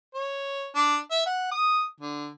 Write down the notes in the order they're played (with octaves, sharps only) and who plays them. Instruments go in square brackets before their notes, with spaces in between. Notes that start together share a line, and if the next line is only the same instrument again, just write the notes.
[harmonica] C#5
D4
E5
F#5
D#6
D3